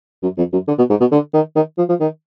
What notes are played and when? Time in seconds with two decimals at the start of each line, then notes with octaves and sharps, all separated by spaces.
0.23 F#2
0.38 F2
0.53 F#2
0.67 D3
0.78 B2
0.90 G#2
1.00 B2
1.12 D3
1.34 D#3
1.56 D#3
1.78 F3
1.89 F3
2.00 D#3